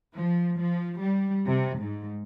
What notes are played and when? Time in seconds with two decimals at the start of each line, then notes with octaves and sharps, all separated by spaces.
0.16 F3
0.59 F3
1.00 G3
1.46 C3
1.80 G#2